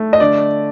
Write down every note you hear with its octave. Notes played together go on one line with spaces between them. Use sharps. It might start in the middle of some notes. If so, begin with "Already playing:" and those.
Already playing: A3
D#5
D3 D5